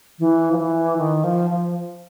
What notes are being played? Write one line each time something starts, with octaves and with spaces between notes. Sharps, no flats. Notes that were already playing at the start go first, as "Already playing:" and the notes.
E3
F3
E3
D#3
F3
F3